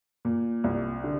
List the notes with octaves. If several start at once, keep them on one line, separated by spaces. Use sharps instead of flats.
A#2
C2
D3